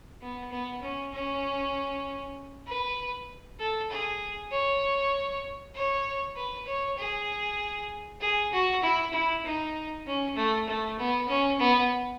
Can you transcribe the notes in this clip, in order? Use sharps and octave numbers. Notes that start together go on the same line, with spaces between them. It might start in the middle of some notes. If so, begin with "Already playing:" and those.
B3
B3
C#4
C#4
B4
A4
G#4
C#5
C#5
B4
C#5
G#4
G#4
F#4
E4
E4
D#4
C#4
A3
A3
B3
C#4
B3